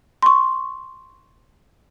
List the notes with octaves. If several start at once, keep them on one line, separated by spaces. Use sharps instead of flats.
C6 C#6